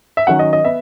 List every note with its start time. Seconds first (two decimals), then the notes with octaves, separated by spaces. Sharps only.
0.17 E5
0.27 D#3 F#3 C#4 F#5
0.39 D#5
0.53 D#5
0.64 B3 E5